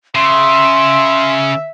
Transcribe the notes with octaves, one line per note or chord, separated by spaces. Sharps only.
C#3 E5 C6